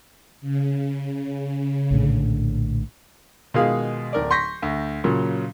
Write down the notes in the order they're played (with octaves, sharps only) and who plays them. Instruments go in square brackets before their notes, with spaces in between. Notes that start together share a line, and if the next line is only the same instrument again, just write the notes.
[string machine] C#3
[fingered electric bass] A#1 A2 D3
[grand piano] B2 D#3 G#3 F4 G#4 F5
D1 A#4 D5
C6 C#6 G6 A#6 B6
D2
A#2 C#3 F#3